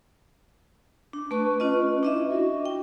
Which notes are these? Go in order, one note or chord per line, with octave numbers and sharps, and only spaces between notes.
D4
A3 B4 C#6
C#4 F4 D#5
D4 E4 D#5 E5
F#4
G5